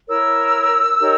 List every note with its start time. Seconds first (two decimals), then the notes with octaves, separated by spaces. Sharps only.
0.08 E4 A#4 C#5 E6
0.99 D#4 G4 A#4 C#5